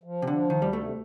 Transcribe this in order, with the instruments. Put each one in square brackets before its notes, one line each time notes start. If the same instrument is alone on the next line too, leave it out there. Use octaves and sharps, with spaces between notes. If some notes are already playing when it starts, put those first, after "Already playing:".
[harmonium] F3
[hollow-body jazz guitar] C3
[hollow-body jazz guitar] D3 [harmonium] F3
[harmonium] D2 [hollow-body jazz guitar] D#3
[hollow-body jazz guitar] G3
[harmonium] C3 [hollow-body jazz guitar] A3